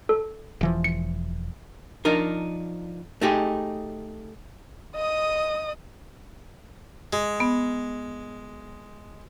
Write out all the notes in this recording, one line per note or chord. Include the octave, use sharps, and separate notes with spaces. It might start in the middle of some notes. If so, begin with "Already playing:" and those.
A4
E1 E3 F3
C#7
F3 D4 D#4 A#4
A3 D#4 G4 G#4
D#5 D#6
G#3
B3